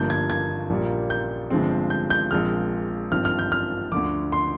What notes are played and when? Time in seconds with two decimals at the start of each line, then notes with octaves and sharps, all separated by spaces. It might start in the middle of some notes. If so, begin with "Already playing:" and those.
Already playing: G1 G2 F3 A#3 G6
0.10 G#6
0.30 G#6
0.70 A#1 A#2 G3 A#3
1.10 G6
1.50 G1 G2 F3 G#3 C4
1.90 G6
2.10 G6
2.31 A#1 A#2 F3 G#3 C4 F6
3.12 G#1 G2 F3 C4 F6
3.25 F6
3.39 G6
3.52 F6
3.92 D2 D3 F3 D6
4.32 C6